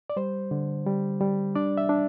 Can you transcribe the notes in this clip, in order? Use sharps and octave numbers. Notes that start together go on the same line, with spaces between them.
D5
G3 C5
D3
G3
G3
D4 D5
E5
D4